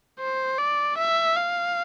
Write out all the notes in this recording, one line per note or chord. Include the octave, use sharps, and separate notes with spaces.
C5
D5
E5
F5